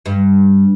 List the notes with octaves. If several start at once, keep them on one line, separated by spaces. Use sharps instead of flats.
G2